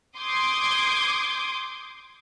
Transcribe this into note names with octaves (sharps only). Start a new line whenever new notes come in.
C6 D6 D#6 G6 G#6